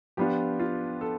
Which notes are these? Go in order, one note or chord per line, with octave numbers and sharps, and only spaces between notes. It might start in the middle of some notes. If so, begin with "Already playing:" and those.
F3 B3 D4 F4 G4
F4
A4